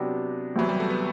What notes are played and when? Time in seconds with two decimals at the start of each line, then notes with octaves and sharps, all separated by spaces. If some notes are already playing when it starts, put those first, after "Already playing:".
Already playing: C3 F#3 B3 D4 G4
0.56 D2 C3 E3 F#3 B3 E4
0.69 G3
0.80 A3
0.90 B3